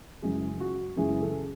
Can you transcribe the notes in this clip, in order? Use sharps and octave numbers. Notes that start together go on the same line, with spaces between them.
F#2 C#3 E3 G#3 G#4
F#4
F#2 C#3 E3 G#3 G#4
A4